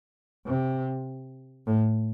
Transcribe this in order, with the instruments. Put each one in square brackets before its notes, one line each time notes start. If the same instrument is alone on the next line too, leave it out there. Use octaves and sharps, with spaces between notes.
[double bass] C3
A2